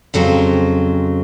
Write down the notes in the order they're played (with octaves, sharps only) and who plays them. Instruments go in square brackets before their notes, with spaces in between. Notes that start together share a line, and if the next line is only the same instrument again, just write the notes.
[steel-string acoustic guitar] F2 C#3 F#3 C4